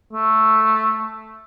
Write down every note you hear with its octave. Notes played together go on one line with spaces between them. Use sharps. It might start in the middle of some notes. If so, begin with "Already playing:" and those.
A3